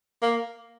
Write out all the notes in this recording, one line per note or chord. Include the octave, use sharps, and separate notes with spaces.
A#3